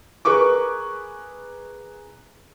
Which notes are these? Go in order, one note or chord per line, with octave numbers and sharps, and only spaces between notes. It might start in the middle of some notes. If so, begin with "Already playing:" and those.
G#4 A#4 B4 C#6 D6